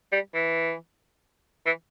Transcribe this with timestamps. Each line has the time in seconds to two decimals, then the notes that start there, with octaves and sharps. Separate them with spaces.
0.12 G3
0.34 E3
1.66 E3